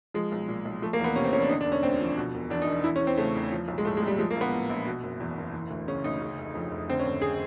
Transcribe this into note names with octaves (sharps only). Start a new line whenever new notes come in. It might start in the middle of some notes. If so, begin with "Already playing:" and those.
F3 G#3
B1
A#2
B1
F3 A3
A#3
E2 B3
C3 C#4
C4
E2 C#4
D4
D3 D#4
D4
E1
C#4
D2 C4
F3
B2
E1
E2 D4
D#4
E1
E3 E4
C#4
E2
C4
C#3 A3
E2
F3
B1
G#3
A2 A3
G#3
B1 G3
F3 G#3
A#3
A#1
B3
A2
A#1
B2
F#1
E2
F#1
E3
D2
C#3 C#4
D2 D#4
C#3
F1
F2
F1
D3 C4
C#4
G#1
G#4